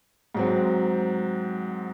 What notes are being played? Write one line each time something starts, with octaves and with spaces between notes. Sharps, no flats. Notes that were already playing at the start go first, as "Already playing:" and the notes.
G#2 F#3 C4